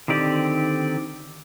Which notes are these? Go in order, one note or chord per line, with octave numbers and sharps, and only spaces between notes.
D3 D#3 C4 G4 D5